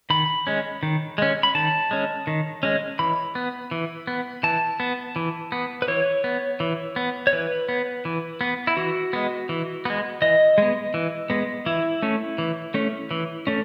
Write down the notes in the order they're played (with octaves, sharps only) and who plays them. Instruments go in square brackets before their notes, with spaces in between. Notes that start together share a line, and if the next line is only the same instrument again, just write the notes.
[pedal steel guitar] D#3 B5
G#3 C#4
D#3
G#3 C#4
B5
D#3 A5
G#3 C#4
D#3
G#3 C#4
E3 B5
B3
E3
B3
E3 A5
B3
E3
B3
B4
E3 C#5
B3
E3
B3
C#5
E3 B4
B3
E3
B3
E4
E3 F#4
G#3 B3
E3
G#3 B3
E3 D#5
G#3 B3
E3
G#3 B3
E3 E4
A3 C#4
E3
A3 C#4
E3
A3 C#4